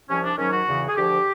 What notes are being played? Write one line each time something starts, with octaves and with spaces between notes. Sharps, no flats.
C2 C3 F3 C#4
D4
G#2 D#3 F#3 C#4
F#4
E2 C#3 E3
G#4
D2 D3 F3 G4